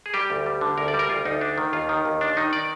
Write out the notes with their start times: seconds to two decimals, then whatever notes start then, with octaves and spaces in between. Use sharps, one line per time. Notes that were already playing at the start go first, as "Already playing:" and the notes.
0.06 G#4
0.14 G3 G4
0.30 D2
0.46 G3
0.61 D3
0.78 D2 A#4
0.88 D5
0.94 G3
0.99 A#4
1.10 D2 F4
1.25 D2 D#4
1.41 D4
1.58 D#3
1.73 D#2 F4
1.89 D#3
2.05 D#2
2.21 D4
2.37 D#3 D#4
2.53 D5